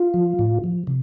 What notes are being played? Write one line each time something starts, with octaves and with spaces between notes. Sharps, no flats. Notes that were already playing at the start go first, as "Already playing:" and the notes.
Already playing: F4
F3
A2
F3
C3